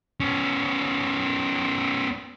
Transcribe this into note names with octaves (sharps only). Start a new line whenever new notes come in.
B3 C#4